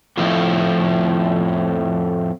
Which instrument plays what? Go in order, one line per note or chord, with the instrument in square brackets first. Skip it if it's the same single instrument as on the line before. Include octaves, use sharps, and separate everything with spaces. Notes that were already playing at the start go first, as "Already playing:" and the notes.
[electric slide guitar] F2 A2 F3 E4